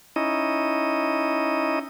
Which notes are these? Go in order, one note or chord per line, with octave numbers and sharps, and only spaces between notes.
C#4 D#4 E4 D#5